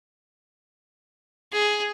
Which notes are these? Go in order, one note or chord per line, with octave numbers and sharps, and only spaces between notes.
G#4